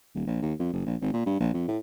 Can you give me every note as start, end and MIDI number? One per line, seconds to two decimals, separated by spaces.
0.15 0.25 27
0.27 0.42 34
0.42 0.54 39
0.59 0.70 41
0.73 0.83 30
0.86 0.95 34
1.02 1.12 32
1.13 1.22 46
1.26 1.39 43
1.40 1.50 34
1.54 1.65 41
1.68 1.78 45